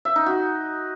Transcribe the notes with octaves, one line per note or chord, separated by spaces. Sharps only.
E5
D#4
F#4